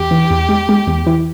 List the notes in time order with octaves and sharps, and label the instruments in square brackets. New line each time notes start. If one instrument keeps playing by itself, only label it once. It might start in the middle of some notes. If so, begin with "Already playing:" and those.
Already playing: [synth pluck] E2 [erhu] G4
[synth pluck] E3
E2
G#3
G#3
E2
E3